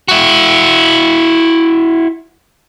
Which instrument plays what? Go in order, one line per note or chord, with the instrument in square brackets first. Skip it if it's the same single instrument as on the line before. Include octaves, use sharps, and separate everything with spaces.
[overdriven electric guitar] E4 F#4